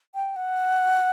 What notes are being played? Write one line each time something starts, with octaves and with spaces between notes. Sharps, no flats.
G5
F#5